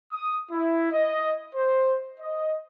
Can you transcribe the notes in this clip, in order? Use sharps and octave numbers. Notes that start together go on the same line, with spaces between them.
D#6
E4
D#5
C5
D#5